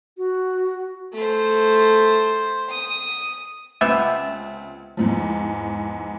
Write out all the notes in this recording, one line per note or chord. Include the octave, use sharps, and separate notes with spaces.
F#4
A3 C5
D#6
C#2 C3 B3 E5
E2 G#2 F3